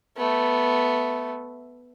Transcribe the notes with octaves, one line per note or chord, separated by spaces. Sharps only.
A3 B3